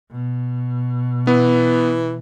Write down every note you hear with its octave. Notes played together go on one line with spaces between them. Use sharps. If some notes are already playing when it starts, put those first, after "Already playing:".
B2
E3 B3